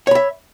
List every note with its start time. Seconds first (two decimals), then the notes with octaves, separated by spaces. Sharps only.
0.07 C#5
0.11 B5
0.15 E5